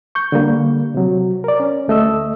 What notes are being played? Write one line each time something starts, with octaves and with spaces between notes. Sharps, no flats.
C#6 G6
D3 G3 A#3
C3 F#3
A#4 D5
C#4
D2 A3 D#5 E6